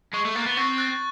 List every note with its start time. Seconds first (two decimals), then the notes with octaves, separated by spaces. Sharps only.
0.14 G#3 C#6
0.25 A3
0.36 A#3 F#6 A6
0.46 B3
0.57 C4 C#6
0.78 F#6 A6